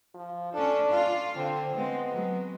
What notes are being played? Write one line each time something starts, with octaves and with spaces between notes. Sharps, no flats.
F3
C#4 D4 A4
F4 F5
D3 C4
G#3 B3 C4
F#3 G#3